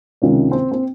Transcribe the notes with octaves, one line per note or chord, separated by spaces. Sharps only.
C#2 C3 D#3 C#4
C4
C4